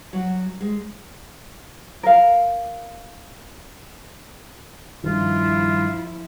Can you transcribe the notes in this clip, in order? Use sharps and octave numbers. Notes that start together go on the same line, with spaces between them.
F#3
G#3
A#4 F5
G2 D#3 F3 E4 F4